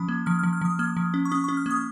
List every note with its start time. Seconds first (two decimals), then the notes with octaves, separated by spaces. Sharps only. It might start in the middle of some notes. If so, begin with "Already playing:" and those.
Already playing: F3 C#4 B5
0.09 A#3
0.26 F3 F6
0.39 F6
0.43 F3
0.53 F6
0.61 F3 D#6
0.79 A#3 F6
0.97 F3
1.14 C#4
1.25 C#6
1.31 C#4 D#6
1.44 C#6
1.48 C#4
1.57 F6
1.66 A#3 D#6